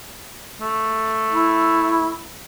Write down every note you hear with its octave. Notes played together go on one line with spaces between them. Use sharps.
A3
E4